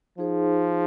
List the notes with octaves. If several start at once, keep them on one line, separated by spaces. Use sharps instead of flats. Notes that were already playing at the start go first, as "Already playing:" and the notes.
F3 D#4 G#4 C5